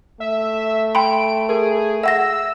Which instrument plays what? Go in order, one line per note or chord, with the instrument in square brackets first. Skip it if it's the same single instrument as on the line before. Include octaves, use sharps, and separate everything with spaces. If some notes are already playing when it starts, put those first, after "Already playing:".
[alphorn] A3 [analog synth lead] E5
[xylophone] G5 B5 C6 [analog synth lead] D7
[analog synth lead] G#4 [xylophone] A#4
[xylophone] E5 F#5 A#6 [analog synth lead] E6